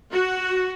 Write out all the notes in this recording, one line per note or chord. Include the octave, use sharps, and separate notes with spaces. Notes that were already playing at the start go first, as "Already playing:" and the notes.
F#4